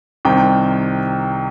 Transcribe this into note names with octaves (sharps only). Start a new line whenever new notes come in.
C2 C3 D#3 G5